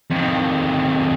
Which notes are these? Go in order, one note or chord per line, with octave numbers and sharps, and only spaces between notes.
F2 D#3